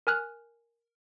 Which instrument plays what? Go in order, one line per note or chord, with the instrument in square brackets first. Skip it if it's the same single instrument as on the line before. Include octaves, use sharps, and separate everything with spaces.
[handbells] A#4 G#5 F6 F#6